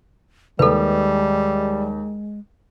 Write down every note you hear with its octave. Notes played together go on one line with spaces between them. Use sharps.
D#2 G3 G#3 A4 B4